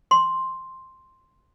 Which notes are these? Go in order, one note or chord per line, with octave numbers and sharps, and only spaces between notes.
C6